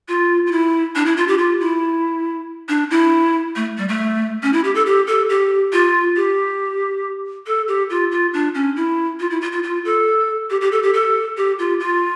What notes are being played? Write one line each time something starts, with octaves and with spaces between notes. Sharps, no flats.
F4
F4
E4
D4
E4
F4
G4
F4
E4
D4
E4
A3
G3
A3
C#4
E4
G4
A4
G4
A4
G4
F4
G4
A4
G4
F4
F4
D4
C#4
E4
F4
E4
F4
F4
F4
A4
G4
G4
A4
G4
A4
G4
F4
F4